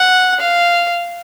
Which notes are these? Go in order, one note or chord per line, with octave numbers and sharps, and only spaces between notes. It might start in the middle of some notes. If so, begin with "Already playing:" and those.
Already playing: F#5
F5